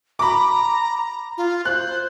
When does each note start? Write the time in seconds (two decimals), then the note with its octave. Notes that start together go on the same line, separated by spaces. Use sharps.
0.19 A#5 B5 D6
1.37 F4
1.65 C5 F#6